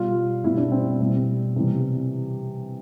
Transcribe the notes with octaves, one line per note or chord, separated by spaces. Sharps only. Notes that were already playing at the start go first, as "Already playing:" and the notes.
Already playing: B2 G3 F4
B2 G3 E4
D4
C4
B2 G3
C3 E3 G3